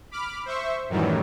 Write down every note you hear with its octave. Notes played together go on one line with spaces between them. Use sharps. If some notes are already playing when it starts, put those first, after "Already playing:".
B5 D6 F6
C5 E5 C#6
F#2 A2 D#3 E3 F#3 G3